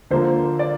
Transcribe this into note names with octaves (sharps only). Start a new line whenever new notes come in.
D3 F3 A#3 C5
D5